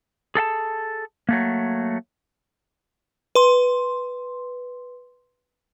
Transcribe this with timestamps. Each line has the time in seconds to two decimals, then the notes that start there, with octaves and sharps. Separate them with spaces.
0.35 G#4 A4 F5 A5
1.29 F#3 A3 A#3
3.35 B4 C6